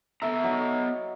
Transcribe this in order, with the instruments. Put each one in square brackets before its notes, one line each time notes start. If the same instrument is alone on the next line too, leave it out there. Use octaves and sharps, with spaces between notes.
[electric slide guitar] B3 A4 A#5 [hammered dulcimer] E5
[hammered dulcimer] F#3 D#4